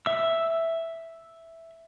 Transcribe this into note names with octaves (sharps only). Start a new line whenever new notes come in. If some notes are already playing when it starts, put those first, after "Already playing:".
E5 E6